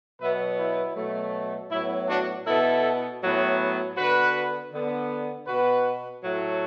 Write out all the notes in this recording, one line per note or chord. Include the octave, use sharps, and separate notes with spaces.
B2 F#3 B3 B4 E5
E4
B2 F#3 A3
A2 F#3 B3 E4
D4 F#4
B2 B3 E4 A4
A2 F#3 B3
D3 B3 F#4 B4
D3 B3
B2 B3 F#4 B4
A2 F#3 A3